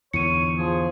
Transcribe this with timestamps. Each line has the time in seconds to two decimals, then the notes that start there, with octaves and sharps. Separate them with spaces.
0.14 E2 G#2 D3 C#5 C#7 D#7
0.58 F3 G#4